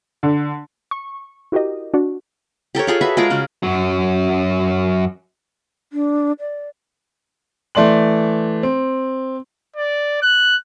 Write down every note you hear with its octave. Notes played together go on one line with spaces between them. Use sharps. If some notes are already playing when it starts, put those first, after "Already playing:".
D3
C#6
E4 F#4 G4 A#4 D#5
D4 F#4
G4 A4 A#4 C#5
F4 G#4 A4
F#4 B4 E5
G#3 F4 G#4 A#4
C#3 F#4
F#2 F#3
D4
D5
E3 A3 D5 C6 F#7
C4
D5
F#6